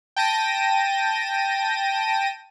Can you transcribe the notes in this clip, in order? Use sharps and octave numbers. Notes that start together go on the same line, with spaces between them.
G5 A5 A#6 D#7